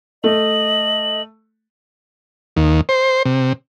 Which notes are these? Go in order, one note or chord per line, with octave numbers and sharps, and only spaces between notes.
A3 D#5 F#7
D#2
C5
C3